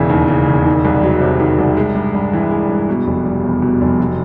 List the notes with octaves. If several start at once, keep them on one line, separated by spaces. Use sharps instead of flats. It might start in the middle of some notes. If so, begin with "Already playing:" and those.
Already playing: E1 C#3 E3
D#2
C#3
E1
D#3
C2
F#3
C3
D#3
C2
G#3
G2
G2
E3
G#3
G2
B2
F1
G3
E2
B2
F1
F#3